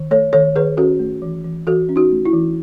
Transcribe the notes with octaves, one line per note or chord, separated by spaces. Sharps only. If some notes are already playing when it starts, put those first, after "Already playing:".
Already playing: D#3
A3 A4 C#5
D#3 A4 C#5
D#3 G#4 B4
C#4 F#4 A4
A3
E3
E3
E3 F#4 A4
C#4
D#4 F#4
A3
E4
E3